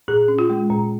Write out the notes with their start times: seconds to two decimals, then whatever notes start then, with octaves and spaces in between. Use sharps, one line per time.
0.08 A#2 G#4
0.28 C#4
0.39 F4
0.50 G#3
0.70 A#2